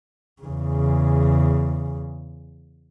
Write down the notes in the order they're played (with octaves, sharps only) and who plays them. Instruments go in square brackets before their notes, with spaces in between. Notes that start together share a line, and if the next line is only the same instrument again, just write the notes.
[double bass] E2 C#3